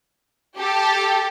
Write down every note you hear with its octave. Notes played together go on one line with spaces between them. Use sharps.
G4 A4